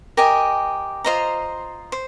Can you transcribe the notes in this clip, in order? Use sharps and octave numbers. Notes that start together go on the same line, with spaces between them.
G4 A#4 D#5 G#5
F4 C5 D#5 A#5
C5